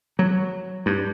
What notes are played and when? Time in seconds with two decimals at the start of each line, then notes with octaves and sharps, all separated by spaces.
0.19 F#3
0.86 G2